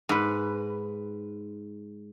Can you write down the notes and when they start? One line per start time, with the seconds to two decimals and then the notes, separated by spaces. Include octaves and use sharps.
0.09 G#2 B4